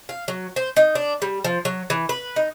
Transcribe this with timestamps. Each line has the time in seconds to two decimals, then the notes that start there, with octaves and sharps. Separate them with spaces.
0.09 F5
0.28 F#3
0.56 C5
0.76 D#4
0.95 D4
1.22 G3
1.44 F3
1.65 F#3
1.90 E3
2.09 B4
2.36 D#4